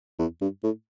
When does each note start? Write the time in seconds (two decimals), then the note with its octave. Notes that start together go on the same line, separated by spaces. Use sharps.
0.19 E2
0.41 G2
0.63 A2